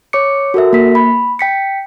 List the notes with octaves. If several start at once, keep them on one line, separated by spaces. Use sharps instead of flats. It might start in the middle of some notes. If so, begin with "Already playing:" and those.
C#5 D6 C#7
F#4 A4 A#4 E5
A#3 B6
B5
G5 B6 C#7